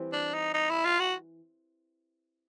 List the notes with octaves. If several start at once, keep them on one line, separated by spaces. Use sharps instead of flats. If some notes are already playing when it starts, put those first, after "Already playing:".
Already playing: E3 G3 C4
D4
D#4
D#4
E4
F4
F#4